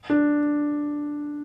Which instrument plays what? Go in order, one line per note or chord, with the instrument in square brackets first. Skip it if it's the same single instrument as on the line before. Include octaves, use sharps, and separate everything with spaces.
[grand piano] D4